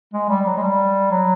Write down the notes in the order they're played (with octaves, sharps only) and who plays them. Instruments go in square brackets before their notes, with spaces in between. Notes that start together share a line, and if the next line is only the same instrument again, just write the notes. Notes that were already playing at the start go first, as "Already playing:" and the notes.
[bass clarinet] G#3
G3
F#3
G#3
G3
F#3